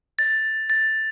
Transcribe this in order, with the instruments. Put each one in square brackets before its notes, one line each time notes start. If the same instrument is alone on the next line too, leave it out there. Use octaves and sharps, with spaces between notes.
[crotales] A6
A6